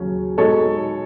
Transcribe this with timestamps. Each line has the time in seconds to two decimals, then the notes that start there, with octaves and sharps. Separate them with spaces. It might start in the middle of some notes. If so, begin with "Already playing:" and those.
Already playing: D#2 C#3 F#3 C#4
0.38 B2 G#3 D#4 A4 C#5